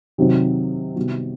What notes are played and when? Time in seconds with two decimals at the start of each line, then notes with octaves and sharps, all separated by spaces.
0.18 C3 D#3 F#3 C4
0.96 C3 D#3 G3 B3 F#4